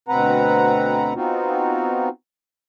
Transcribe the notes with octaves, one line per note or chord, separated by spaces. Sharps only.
D2 B2 C4 B4 F#5 A#5
B3 C4 D#4 F4 F#4